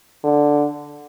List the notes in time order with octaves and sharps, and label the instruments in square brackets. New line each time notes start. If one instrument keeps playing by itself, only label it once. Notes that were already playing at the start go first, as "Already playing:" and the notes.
[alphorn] D3